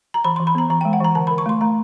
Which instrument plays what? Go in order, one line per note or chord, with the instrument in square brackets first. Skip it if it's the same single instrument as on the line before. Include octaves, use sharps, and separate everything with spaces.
[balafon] A#5
E3 B5
C6
E3
B5
B3 A#5
E3 A#5
G5
G#3
F#5
E3 A#5
D3 A5
B5
D3
C#6
A3 C6
A3 A#5